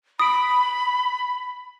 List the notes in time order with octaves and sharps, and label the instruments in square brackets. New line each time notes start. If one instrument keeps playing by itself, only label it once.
[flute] B5 [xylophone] D#6 D7